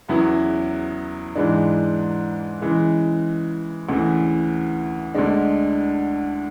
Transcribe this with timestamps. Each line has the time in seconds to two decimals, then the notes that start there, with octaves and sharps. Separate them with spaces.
0.09 E2 C#3 F#3 B3 E4
1.36 G#2 E3 G#3 D4
2.62 C#3 E3 G#3
3.89 D2 C#3 E3
5.14 D2 D3 G#3 D4